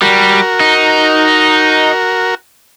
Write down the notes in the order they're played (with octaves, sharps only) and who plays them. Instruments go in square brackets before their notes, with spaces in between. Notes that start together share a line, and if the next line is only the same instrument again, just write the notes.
[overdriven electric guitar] G3 [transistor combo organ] F#4 A#4
[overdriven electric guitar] D#4